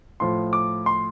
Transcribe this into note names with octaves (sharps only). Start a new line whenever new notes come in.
A2 F3 C6
D6
C6